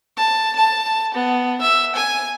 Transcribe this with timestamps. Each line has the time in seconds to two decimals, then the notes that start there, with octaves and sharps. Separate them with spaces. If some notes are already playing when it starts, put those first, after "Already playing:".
0.17 A5
0.55 A5
1.14 B3
1.61 E5
1.95 G#5